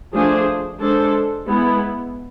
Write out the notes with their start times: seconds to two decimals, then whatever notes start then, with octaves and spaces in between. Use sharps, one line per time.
0.13 F3 A3 D4 G#4 C5
0.80 G#3 D4 A4 C5
1.47 G#3 B3 E4